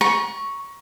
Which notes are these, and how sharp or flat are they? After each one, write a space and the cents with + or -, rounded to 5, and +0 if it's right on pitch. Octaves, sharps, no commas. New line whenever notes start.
A#5 +40 C#6 +0